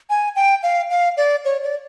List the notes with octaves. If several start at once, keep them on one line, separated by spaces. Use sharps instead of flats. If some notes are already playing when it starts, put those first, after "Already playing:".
G#5
G5
F5
F5
D5
C#5
D5